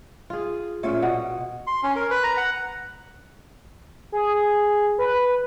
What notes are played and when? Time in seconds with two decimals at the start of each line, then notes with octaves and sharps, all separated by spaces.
0.30 F4 G#4
0.83 A#2 C#4 F4 C#5 E5
1.02 B2 F#5
1.67 C6
1.83 C#4
1.96 A#4
2.11 B4
2.24 A#5
2.37 F#5
4.12 G#4
4.98 B4